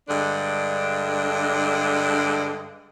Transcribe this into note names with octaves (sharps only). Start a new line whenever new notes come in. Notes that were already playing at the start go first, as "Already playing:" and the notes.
G2 D3 G#3 D4